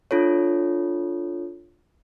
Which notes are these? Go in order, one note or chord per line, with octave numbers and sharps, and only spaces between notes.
D4 F4 A4 C#5